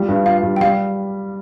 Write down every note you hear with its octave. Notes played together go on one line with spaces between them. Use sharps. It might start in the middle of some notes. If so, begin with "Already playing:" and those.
Already playing: G3 F4
G2
F4 F5
G2
G5
G3 F5